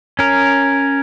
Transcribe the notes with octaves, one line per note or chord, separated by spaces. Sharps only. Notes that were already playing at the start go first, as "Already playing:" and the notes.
C#4 A#4